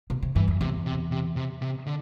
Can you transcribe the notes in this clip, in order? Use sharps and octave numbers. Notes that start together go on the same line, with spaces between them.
B2
C3
G2 E3
F2
E2 C3
C3
C3
C3
C3
D3